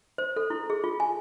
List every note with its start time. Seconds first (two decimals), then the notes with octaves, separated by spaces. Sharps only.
0.18 C5
0.36 A4
0.50 E4
0.70 G#4
0.84 F4
1.00 G#5